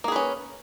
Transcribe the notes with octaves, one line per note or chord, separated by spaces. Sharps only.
A#3 C#4 G#4 B4